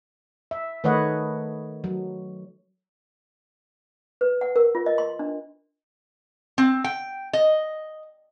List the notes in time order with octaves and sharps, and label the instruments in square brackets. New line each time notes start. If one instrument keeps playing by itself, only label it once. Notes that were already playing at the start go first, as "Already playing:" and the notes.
[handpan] E5
D#3 A3 B4 C#5 D#5 F#5
F#3
[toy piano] B4
F#5
A#4
F4
D#5
C6
D4
[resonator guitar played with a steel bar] C4
G5
D#5